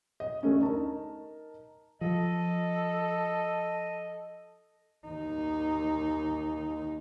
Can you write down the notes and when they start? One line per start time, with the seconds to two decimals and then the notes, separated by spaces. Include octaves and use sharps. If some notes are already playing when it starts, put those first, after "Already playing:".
0.20 D#5
0.43 D2 A3 C#4
0.61 D#4 A#4 A5
2.01 F3 A4 D#5
5.07 D#2 D#4